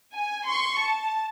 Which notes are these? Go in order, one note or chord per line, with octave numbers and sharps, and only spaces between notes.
G#5
C6 C#6
A5